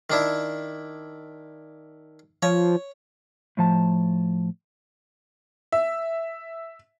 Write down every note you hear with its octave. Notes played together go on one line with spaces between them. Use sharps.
D#3 D4 E4
F3 C#5
A2 F3 A5
E5